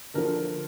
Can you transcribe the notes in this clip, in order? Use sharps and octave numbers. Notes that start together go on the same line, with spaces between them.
D3 F3 A#4